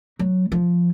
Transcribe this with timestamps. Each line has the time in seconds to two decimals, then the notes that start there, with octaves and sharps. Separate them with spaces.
0.19 F#3
0.52 F3